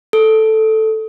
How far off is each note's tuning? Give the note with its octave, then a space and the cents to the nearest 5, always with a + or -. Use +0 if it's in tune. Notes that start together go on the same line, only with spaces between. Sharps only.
A4 +0